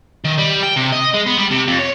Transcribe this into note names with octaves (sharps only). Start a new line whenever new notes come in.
D#3
G3
G5
C3
D#5
G#3
B3
G3
C3
F2
C#5